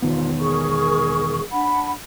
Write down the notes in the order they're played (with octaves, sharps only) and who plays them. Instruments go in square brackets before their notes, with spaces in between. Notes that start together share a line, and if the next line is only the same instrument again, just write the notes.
[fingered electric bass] E1 D#3 B3 [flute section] F4
[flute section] G#4 A#4 C#6
D4 F#5 B5